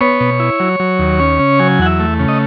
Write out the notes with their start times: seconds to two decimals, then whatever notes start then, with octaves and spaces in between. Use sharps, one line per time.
0.01 B3 C#5
0.20 B2
0.40 E4
0.60 F#3
0.80 F#3
0.99 D#2
1.20 C#4
1.39 C#3
1.59 F#3 G#5
1.79 E2 F#5
1.86 E5
2.00 A3
2.19 C#3
2.28 D#5